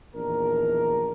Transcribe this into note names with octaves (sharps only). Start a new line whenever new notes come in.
A#1 E2 D#3 D4 A#4